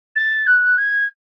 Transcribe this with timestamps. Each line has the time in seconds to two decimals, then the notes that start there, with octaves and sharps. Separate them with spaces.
0.15 A6
0.46 F#6
0.77 G#6